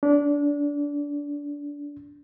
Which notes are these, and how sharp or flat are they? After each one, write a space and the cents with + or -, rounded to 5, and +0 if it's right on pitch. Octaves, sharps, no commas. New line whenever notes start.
D4 -20